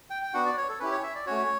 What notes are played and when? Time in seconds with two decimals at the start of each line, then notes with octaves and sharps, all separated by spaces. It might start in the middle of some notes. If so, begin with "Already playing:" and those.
0.10 G5
0.23 G5
0.34 B3 D4 F#4 F#5
0.45 D5
0.57 C#5
0.68 A4
0.80 C#4 E4 G4 B4
0.92 C#5
1.03 E5
1.15 D5
1.26 A3 C#4 F#4 C#5